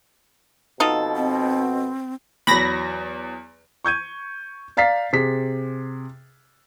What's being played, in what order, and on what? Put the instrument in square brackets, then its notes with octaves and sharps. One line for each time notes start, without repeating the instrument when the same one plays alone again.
[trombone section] F2 B2 [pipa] D#4 F4 A4
[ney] C4
[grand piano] E2 F#3 [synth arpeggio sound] B5 A#6
[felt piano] C#6 G6 G#6 D#7
D5 F5 A#5 A6 B6 C7
C3 G#4 B6